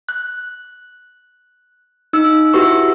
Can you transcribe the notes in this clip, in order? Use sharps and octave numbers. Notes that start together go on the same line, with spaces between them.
F#6
D#4 E6
E4 F#4 G4 B4 C#6 E6